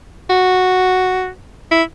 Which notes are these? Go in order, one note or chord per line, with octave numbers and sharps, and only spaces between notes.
F#4
E4